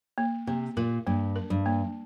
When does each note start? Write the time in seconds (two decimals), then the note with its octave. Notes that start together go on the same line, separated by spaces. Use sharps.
0.18 A#3
0.47 C3 A#3
0.77 A#2 A#4
1.07 G2 A#3
1.36 A#4
1.50 G2
1.66 A#3